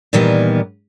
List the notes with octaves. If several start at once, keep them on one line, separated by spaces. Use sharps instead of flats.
A#2 D#3 E3 G3 B3